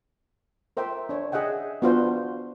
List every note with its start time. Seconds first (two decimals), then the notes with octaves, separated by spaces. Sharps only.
0.77 A#4 C5 E5 G5
1.09 D4 C#5
1.32 G#4 D#5 E5 F#5 G5
1.82 B3 D4 F4 F#4 B4 C5